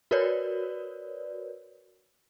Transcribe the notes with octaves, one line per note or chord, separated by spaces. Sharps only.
F#4 A#4 B4 C#5 D5